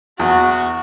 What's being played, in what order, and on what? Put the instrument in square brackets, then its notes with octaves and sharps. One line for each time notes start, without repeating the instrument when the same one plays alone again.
[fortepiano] E2 [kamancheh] F#4